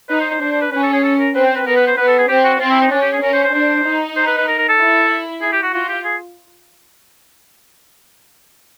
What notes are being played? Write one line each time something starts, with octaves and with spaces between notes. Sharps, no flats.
D#4 B4
C5
C5
D4 C5
C5
B4
C#4 B4
A4
G#4
A4
A#4
C4 B4
C5
B4
B3 A#4
B4
C5
B3 B4
A4
G#4
C4 G4
F#4
C4 F4
E4
D#4
C#4 D4
G4
G#4
C#4 A#4
C5
C5
D4 C5
D#4
C5
B4
B4
A#4
A#4
A4
E4
G#4
G4
F#4
F4 F#4
G4
G#4